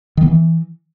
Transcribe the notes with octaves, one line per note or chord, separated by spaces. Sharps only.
D#3
B3
E3